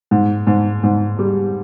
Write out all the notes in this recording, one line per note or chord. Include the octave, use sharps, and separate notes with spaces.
G#2
G#2
G#2
G3